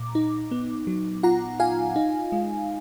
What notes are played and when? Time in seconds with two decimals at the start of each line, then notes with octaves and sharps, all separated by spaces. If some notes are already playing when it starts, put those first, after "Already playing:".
Already playing: A#2 A#5 D6
0.15 D#4
0.51 B3
0.87 F#3
1.23 F4 F#5 A#5
1.60 F4 F5 G#5
1.96 D#4
2.32 G#3